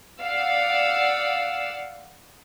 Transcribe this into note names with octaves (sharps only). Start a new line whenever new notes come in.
D5 F5 F#5 E6